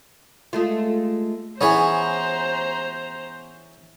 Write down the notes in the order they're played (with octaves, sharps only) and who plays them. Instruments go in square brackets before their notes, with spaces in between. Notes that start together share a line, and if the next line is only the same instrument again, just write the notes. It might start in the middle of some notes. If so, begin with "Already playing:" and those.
[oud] G#3 A3 F4
[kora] E3 B3 [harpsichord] C#4 G#4 C#5 [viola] C5 A#5